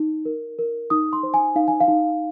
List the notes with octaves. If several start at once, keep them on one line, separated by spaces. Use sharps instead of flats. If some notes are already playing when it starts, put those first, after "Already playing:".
Already playing: D#4
A#4
A#4
D#4 D#6
C6
C5
G#5
D#4 F5
G#5
F5
D#4